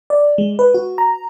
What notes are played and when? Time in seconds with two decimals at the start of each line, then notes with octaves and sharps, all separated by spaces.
0.10 D5
0.38 G#3
0.59 B4
0.74 F#4
0.98 A#5